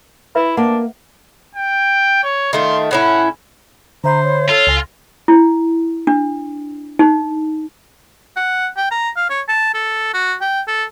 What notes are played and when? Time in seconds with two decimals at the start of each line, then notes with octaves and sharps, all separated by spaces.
0.35 E4 B4 E5
0.57 A#3 D4 F#5
1.55 G5
2.23 C#5
2.53 D#3 A3 F4 C6
2.91 A2 C#4 E4 F#5
4.04 D3 C5 E5 A#5 B5
4.23 C#5
4.49 F4 A4
4.67 C#2 G#5 A#6
5.28 E4
6.07 D4
6.99 D#4
8.36 F#5
8.77 G5
8.91 A#5
9.17 F5
9.30 C#5
9.48 A5
9.74 A4
10.13 F#4
10.41 G5
10.67 A4